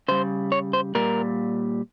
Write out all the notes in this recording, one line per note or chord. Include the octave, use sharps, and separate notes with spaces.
C#3 G3 C5
C#5
C5
A#2 G3 A#4